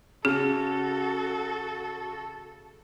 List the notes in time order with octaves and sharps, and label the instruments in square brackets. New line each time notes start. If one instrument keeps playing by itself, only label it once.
[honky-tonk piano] C#3 [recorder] F#4 [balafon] G#4 [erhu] A4